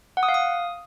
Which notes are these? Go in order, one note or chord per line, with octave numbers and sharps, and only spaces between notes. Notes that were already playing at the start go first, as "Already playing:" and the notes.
F#5
D#6
F5
D#6